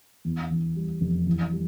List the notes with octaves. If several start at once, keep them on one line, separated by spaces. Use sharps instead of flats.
E2
E3
G3
F1
E3
G3